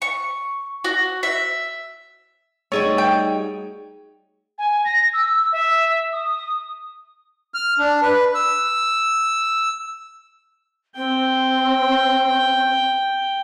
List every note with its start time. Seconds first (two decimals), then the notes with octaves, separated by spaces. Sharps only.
0.02 C#6
0.84 F#4
1.23 E5
2.72 G3 A3 D#4 F#4 G#4 C#5
2.98 G5
4.58 G#5
4.85 A#6
5.13 E6
5.52 E5
6.13 D#6
7.54 F6
7.79 D4
8.02 B4
8.35 E6
10.96 C4 G5